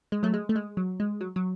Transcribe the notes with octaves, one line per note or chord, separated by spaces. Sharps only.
G#3
F#3 A3
G#3
A3
G#3
F#3
G#3
F#3
F#3